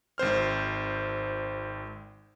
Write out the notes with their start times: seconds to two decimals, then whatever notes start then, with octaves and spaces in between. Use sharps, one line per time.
0.18 G#1 C4 C5 F6